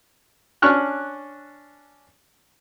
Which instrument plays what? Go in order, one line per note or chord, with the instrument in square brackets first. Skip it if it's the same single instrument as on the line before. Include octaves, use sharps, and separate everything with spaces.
[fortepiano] C#4 D4 C#6 F6 F#6